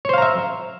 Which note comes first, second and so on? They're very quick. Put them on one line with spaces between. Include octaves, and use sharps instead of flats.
C#5 C5 F5 A#5 E5